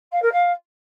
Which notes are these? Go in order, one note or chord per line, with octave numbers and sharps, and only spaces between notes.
F5
A#4
F5